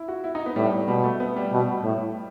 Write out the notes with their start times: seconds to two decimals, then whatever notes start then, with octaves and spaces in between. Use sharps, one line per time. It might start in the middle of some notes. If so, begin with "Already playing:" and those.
Already playing: E4
0.08 F#4
0.24 E4
0.35 D#4
0.46 B3
0.56 A2 G3
0.88 B2 G3
1.04 A3
1.20 B3
1.36 G3
1.52 B2
1.84 A2